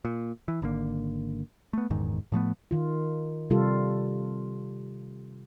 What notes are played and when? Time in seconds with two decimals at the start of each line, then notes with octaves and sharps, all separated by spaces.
0.05 A#2
0.48 E3
0.62 G#1 D3 A#3
1.73 A3 B3
1.90 F#1 E2 G#2 D#3
2.32 A2 F3 A3 B3
2.71 D#3 F4
3.50 C3 G3 F4 A4